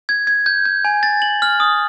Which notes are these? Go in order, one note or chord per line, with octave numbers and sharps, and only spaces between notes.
G#6
G#6
G6
G6
G#5
A6
F#7
F6
D#6